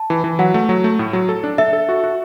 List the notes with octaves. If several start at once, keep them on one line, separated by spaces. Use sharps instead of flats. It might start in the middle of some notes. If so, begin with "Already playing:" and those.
Already playing: A5
E3
E3
F#3 F#5
A3
F#3
A3
A2
F#3
A4
D4
A4 E5
A4
F#4
F#4